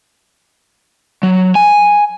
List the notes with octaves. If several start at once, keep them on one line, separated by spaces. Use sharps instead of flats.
F#3
G#5